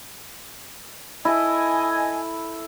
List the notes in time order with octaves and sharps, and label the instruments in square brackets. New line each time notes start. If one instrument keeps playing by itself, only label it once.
[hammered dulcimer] E4 A4 [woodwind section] D#5 G#5